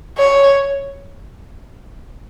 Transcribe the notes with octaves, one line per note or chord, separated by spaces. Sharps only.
C#5